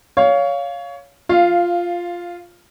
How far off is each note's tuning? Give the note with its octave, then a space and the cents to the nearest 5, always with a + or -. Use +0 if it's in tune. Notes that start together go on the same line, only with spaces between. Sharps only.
C#5 +20 F5 +0
F4 +0 F5 -15